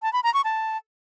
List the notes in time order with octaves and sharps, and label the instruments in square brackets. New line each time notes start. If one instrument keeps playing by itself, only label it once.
[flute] A5
B5
A#5
C#6
A5